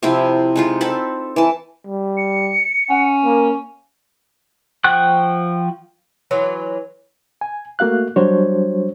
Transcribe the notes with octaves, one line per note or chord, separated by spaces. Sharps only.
C3 F3 C4 E4
G#3 D#4 F4
C4 A4 B5
E3 A5
G3
C#7
C#4 F#5
A#3
F3 F#5 G5 C#6 F#6
E3 F#3 F4 B4
G#5
A3 A#3 F#4 F5 F#6
F#3 G3 D4 F#4 C5 C#5